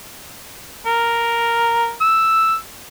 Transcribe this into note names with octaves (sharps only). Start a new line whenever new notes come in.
A#4
E6